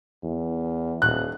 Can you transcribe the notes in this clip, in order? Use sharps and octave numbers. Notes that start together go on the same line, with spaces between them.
E2
D#1 F#6